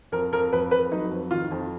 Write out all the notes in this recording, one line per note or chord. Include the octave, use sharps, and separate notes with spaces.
F2 A#4
F2 A#4
F2 B4
F2 B4
F#3 D#4
F2
D#3 F4
F2